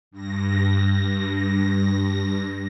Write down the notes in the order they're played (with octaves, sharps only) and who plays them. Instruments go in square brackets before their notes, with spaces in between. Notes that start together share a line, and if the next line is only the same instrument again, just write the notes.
[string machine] G2 A#6